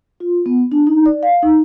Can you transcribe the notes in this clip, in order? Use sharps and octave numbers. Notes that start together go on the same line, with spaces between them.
F4
B3
D4
D#4
D5
F5
D#4